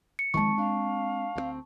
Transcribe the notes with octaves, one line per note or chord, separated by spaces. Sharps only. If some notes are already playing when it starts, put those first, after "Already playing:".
C#7
D#3 F3 G#3 C4 A5 C#6
D4 F5
D2 G3 C4